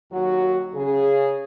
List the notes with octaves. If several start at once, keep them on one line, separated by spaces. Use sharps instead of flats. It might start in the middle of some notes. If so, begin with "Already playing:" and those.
D#2 F#3 F#4
C#3 G#4